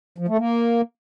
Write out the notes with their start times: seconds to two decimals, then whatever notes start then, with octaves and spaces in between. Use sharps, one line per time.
0.18 F3
0.28 A3
0.38 A#3